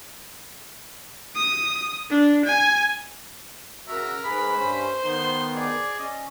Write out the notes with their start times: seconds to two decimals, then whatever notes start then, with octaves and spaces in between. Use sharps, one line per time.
1.35 D#6
2.10 D4
2.45 G#5
3.88 C#3 F#4 A#4 E5
4.24 G#2 G#4 B4 B5
4.55 G2 C#4 C5
5.04 D#3 B3 D#4 C6
5.56 G#4 D5
5.99 C#4 D#5